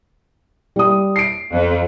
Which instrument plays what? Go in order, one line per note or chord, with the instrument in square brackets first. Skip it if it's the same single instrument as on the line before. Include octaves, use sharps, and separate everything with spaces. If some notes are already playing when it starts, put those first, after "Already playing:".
[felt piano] G3 D#6
C7 D7
[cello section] F2